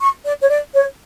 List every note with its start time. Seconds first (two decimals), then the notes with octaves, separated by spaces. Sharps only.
0.01 C#6
0.25 D5
0.42 C#5
0.50 D5
0.74 C#5